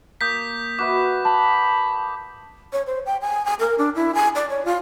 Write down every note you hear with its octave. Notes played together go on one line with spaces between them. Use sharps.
A#3 D#6 G6 B6
F#4 B4 E5 D6
A5 B5
C#5
C5
G5
G#5
G#5
A#4
D4
E4
G#5
D5
C#5
F4